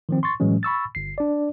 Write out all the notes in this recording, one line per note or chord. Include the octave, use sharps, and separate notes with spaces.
D#3 F3 C4
C6 C#6 A6
A2 E3 F#3 G#3 C#4
B5 C#6 E6 A6
G1 C7
D4 D5